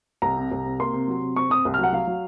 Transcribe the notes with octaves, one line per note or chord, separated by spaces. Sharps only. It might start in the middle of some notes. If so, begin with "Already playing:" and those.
C2 A#5
C3
C2
C3
A#3 C6
C3
F#3
C3
C4 C#6
C4 D#6
C2
F6
F#3
F#5
F#3 F5
F#3